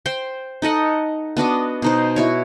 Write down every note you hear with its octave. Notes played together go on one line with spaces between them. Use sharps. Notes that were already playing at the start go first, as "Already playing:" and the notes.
C5 G5 C6
D#4 A4 D#5 F#5
B3 D4 F#4 D#5
B2 D#4 C5
E4 F#4 C#5